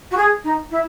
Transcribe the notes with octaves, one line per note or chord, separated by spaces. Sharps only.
F#4
G#4
D#4
E4